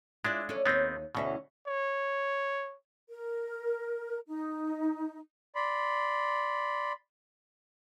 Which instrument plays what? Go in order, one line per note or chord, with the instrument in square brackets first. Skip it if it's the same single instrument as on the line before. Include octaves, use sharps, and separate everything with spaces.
[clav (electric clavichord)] G#3 D4 [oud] E4 F4 D5
[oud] C#4 A4 D5
[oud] D#2 C#5 [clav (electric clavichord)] B3 C4 D#4
[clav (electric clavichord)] D2 B2 [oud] E3 C#4 E4
[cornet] C#5
[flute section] A#4
D#4
[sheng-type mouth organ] D5 B5 C6